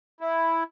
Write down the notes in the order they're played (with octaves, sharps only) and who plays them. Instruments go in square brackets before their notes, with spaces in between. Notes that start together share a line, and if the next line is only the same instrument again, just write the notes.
[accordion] E4